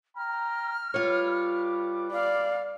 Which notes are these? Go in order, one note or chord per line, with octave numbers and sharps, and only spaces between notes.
G5 A#5 F6
G3 F4 B4 C#5 D6
D5 F5